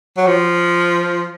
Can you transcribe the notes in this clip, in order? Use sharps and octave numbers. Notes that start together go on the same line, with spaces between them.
F#3
F3